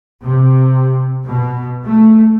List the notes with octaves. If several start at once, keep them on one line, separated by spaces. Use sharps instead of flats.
C3
B2
A3